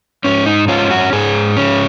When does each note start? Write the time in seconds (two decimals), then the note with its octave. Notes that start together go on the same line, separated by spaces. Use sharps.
0.24 G#2 C#4
0.46 D#4
0.68 C#4 F4
0.91 F#4
1.13 G#2 G#4
1.57 C#4